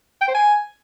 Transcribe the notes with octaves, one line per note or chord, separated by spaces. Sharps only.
G5
C5
G#5